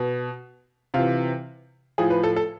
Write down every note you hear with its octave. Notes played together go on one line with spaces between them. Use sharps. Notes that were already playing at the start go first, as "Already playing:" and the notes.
Already playing: B2
C3 E3 F4
A2 F3 G#4
B4
A4
A4